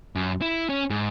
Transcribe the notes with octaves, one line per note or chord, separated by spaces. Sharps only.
F#2
E4
C#4
G#2